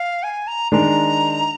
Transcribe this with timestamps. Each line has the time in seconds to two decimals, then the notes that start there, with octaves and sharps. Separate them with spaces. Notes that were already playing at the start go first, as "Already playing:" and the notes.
Already playing: F5
0.23 G#5
0.47 A#5
0.72 D#3 G#3 D4 A#5